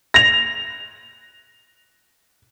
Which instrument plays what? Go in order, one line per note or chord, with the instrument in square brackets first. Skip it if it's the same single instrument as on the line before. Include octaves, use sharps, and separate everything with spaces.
[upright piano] A#6 F7